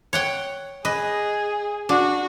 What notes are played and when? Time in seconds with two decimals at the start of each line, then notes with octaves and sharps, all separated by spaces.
0.13 C#5 F#5 G5
0.85 G#4 B4 D#5
1.89 D4 F#4